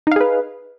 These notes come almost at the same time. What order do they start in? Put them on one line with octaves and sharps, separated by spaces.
D#4 F5 G#4 B4